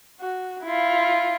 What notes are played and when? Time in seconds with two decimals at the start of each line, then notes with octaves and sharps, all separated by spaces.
0.20 F#4
0.64 E4 F4